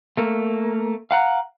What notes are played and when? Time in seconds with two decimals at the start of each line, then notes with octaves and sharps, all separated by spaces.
0.17 A3 A#3
1.11 F5 F#5 A#5